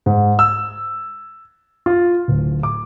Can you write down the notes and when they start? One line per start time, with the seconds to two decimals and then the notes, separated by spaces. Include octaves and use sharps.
0.06 G#2
0.39 E6
1.86 F4
2.28 D1
2.63 D6